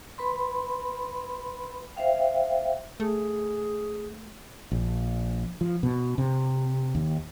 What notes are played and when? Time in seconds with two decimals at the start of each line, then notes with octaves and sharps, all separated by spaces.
0.18 B4 B5 C6
1.96 C5 E5 F5 G5
3.00 A3 G#4
4.72 A#1
5.61 F3
5.83 B2
6.18 C3
6.95 D#2